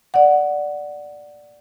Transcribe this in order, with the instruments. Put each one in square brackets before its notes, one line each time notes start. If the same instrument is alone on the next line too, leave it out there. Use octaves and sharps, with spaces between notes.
[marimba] D5 F#5